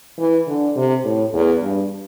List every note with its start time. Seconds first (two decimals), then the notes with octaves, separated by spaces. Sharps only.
0.18 E3
0.48 D3
0.76 C3
1.04 A2
1.33 E2
1.62 G2